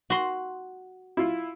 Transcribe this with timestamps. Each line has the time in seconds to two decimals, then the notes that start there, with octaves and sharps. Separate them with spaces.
0.10 F#4 C6
1.17 E4 F4